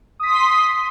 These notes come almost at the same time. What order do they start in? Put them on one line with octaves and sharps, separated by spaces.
D#6 B6 C6